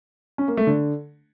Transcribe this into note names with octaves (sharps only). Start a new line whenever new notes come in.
C#4
A#3
A3
D3